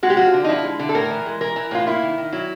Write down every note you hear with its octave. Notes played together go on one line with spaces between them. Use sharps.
G#3 F#4
G4
F3 F#4
D3
D#4
F3 E4
G#3
D3
A4
A2 A#4
E3
G#3
E3 A#4
E3
A2 F4
A#3 E4
D#3
D#3
F#3 E4